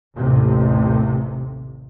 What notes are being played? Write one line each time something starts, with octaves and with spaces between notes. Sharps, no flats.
A1 D#2 C3